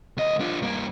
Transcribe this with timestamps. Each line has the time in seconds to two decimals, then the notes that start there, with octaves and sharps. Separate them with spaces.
0.17 D2 D#5
0.40 D4 F4
0.62 G2 A#3